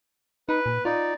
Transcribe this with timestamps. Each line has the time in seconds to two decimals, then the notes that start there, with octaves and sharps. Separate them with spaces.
0.49 D#4 B4
0.66 A#2
0.85 D#4 F4 D5